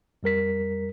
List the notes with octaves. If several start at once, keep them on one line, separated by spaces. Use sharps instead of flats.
F2 G3 A#4 B6